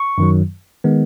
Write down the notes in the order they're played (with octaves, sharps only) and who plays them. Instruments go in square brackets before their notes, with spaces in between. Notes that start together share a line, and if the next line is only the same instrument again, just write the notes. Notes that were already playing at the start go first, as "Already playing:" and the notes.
Already playing: [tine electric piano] C#6
F#2 D#3 F#3
D#3 G#3 B3